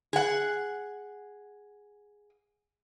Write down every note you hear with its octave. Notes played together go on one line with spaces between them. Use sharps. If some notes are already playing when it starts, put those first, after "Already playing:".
G#4 F#5